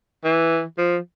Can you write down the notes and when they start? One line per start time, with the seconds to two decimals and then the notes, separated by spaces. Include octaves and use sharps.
0.24 E3
0.78 F3